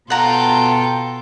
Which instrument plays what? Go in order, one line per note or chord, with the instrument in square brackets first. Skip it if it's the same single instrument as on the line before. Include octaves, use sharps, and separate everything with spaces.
[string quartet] B2 A4 [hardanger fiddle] F4 G5 [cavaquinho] F#5 A#5